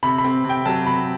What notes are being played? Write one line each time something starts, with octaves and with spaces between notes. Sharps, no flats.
C3 B5
B5
C4
C3
G5
F#3 A5
C3 B5